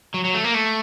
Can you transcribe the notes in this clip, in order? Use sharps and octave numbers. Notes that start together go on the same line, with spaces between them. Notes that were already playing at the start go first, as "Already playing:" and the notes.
F#3
F#3
A3
A#3
A3